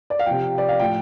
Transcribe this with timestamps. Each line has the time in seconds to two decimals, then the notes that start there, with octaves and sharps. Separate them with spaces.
0.10 D5
0.19 F5
0.26 C3 F3 G5
0.58 D5
0.69 F5
0.79 A2 F3 G5